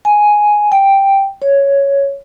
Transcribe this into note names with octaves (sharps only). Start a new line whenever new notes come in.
G#5
G5
C#5